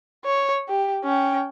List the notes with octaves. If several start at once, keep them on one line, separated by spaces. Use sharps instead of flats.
C#5
G4
C#4 G5